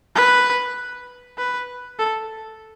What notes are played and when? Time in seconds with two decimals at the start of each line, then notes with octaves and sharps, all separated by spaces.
0.15 B4
1.38 B4
1.99 A4